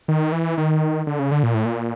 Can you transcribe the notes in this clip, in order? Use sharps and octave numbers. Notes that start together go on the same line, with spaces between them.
D#3
E3
D#3
D3
C#3
D3
A#2
A2
A#2